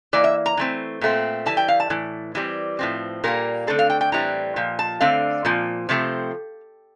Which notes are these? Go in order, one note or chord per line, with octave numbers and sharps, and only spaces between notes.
E3 A#3 D5
E5
A#5
E3 A3 C4
A#2 A3 C4
E3 G3 A5
G5
F5
A5
A2 E3
E3 G3 C4
A2 F3 C4
A#2 G3 A#3 A#4
D3 A3 C4 A4
F5
G5
G5
A2 E3 G3 C4 A#5
A#2 F3
A5
D3 A3 C4 F5
A#2 F3 C4
C3 F3 A3 C4